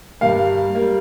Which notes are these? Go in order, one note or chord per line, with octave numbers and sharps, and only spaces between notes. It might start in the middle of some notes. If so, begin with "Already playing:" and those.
G2 G3 A#3 F5
G3 A#3